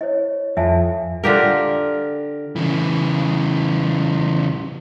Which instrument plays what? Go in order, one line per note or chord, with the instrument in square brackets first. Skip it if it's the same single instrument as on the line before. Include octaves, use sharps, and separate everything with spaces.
[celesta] E4 C5 C#5 [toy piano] D#5
[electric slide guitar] F2 [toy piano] E5 G#5 A5
[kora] D3 F4 G4 A#4
[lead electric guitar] C#3 E3